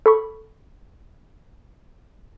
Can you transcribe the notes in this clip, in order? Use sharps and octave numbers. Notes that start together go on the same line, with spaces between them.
A4 B5 C#6